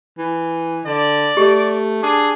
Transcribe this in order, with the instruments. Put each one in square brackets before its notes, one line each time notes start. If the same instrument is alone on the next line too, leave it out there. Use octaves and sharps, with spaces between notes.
[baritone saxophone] E3
[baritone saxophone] D3 [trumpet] D5
[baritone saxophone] A3 [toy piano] G4
[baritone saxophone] D4 [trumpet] G#4